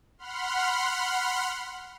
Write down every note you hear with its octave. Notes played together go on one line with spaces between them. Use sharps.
F#5 B5 C6 F6